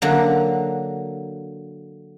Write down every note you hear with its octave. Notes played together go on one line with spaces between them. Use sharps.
D3 F#3 A#3